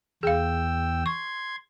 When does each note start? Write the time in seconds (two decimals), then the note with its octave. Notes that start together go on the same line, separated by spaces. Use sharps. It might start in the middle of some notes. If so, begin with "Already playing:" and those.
0.23 E2 G#4 F5 G5 E6
1.06 C6 C#6 G#6